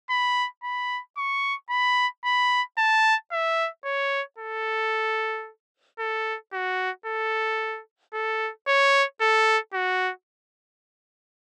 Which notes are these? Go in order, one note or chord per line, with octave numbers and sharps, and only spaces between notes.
B5
B5
C#6
B5
B5
A5
E5
C#5
A4
A4
F#4
A4
A4
C#5
A4
F#4